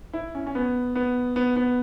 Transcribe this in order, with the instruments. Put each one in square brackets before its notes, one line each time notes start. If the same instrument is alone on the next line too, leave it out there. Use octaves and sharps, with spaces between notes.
[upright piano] E4
C#4
C#4
B3
B3
B3
B3